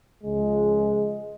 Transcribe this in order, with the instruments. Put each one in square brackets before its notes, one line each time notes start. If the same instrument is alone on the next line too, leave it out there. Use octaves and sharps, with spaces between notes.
[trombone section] C#2 C#3 F3 G#3